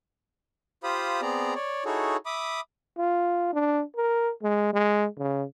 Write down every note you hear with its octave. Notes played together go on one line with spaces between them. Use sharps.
F4 G4 C5 F5 B5 D#6
B3 C4 G#4 D5 A#5
C#5 D5
D#4 E4 F#4 G#4 A4 C#5
E5 B5 D6 D#6
F4
D4
A#4
G#3
G#3
C#3